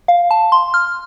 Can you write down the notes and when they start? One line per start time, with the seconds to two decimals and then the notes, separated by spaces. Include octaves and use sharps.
0.08 F5
0.31 A5
0.52 C6
0.74 F6